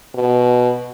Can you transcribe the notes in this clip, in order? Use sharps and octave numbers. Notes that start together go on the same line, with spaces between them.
B2